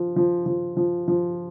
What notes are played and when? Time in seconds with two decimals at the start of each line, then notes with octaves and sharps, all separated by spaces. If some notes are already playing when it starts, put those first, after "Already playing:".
Already playing: F3
0.16 F3
0.46 F3
0.77 F3
1.08 F3